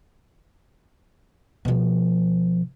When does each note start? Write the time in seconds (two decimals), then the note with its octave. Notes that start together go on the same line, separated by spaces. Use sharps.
1.65 B2 F3